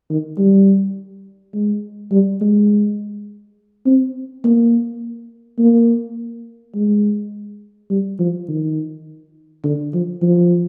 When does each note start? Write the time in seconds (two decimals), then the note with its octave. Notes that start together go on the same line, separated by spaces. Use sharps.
0.10 D#3
0.38 G3
1.54 G#3
2.12 G3
2.41 G#3
3.86 C4
4.44 A#3
5.59 A#3
6.75 G#3
7.90 G3
8.20 F3
8.49 D#3
9.64 D3
9.94 F3
10.22 F3